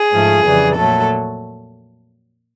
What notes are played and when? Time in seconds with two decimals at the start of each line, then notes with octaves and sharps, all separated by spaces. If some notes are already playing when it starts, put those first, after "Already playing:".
Already playing: G#4
0.13 G#2 F3 A3
0.45 F2 C#3 E3 G3
0.77 A#2 F#3 A3 A4